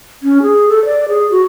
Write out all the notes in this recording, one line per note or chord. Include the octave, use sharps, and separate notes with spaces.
C#4
G#4
A4
D5
G#4
F#4